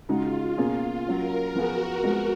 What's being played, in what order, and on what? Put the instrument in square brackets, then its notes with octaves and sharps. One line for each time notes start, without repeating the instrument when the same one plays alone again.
[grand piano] C#3 G#3 D#4 F#4 [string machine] F4
[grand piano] B2 A#3 C#4 F4 G#4
[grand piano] F#3 C#4 F4 [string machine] A#4
[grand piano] F3 B3 F4 G#4 [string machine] F#4
[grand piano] F3 G#3 B3